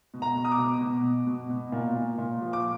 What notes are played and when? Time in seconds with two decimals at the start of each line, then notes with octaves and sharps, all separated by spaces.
0.14 B2
0.22 A#5
0.37 B2
0.45 D#6
0.52 D6
0.59 B2
0.81 B2
1.04 B2
1.27 B2
1.50 B2
1.72 A#2
1.96 A#2
2.18 A#2
2.41 F3
2.53 D6